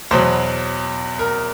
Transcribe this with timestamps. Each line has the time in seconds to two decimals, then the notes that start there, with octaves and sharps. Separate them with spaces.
0.11 E2 B2 F#3 C5
1.19 A#4